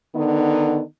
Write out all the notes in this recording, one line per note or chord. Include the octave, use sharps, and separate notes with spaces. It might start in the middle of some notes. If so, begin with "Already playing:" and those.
D3 D#3 B3 D#4